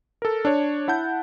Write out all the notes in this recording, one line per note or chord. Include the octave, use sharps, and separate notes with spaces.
A4 A#4
D4 C#5
E4 F#5 A5 G6